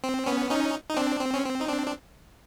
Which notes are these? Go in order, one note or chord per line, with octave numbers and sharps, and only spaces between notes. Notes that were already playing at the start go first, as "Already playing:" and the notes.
C4
B3 C#4
C#4 D#4
D#4
C4 D4
C4
C#4
C4
D#4
C4 D4
D4